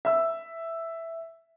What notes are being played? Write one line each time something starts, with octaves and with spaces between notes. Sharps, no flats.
E5 E6